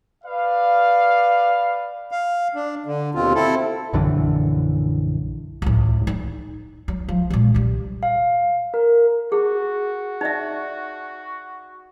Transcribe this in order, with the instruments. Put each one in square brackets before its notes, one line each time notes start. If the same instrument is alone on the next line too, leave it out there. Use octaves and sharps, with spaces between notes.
[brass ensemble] B4 D5 F5
[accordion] F5
D4
D3
D#2 B2 C4 F4
C4 E4 A4
[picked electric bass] A#1 F#2 D3 E3
[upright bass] C#2 A2
D#4
F#3
F3
A#2 G#3
C3 G3
[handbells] F5
A#4
[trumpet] F#4 [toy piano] G#4
[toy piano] D#4 D5 E5